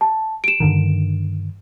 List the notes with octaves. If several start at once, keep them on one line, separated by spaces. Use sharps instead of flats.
A5
D7 E7
G2 D3 D#3